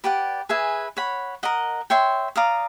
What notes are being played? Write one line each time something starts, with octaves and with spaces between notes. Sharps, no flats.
G4 B4 D5 F#5
G#4 B4 E5 G#5
C#5 F#5 B5
A#4 D#5 F#5
C#5 E5 G5 C6
D5 F5 A#5 D#6